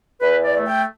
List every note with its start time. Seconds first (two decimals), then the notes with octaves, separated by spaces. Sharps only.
0.21 E2 B4
0.43 D5
0.55 A3
0.66 G5